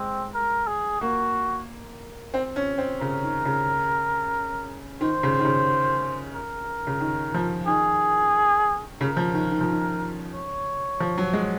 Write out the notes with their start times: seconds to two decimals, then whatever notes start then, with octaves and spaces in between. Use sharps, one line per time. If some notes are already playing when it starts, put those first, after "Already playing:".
Already playing: G#3 C4
0.34 A#4
0.67 G#4
1.01 A#3 F#4
2.34 C4
2.56 C#4
2.78 C4
3.01 C#3 A#4
3.23 D#3
3.45 C#3
5.01 D#3 C5
5.23 C#3
5.39 D#3
5.45 C#3
6.33 A#4
6.87 C#3
7.00 D#3
7.34 F3
7.67 D#3 G#4
9.01 C#3 A#4
9.17 F3
9.34 D#3
9.51 D#3
9.61 F3
9.71 D#3
10.34 C#5
11.00 F3
11.18 F#3
11.33 G#3